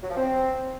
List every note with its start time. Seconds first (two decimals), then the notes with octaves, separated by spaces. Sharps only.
0.02 F#3
0.09 F3
0.16 C4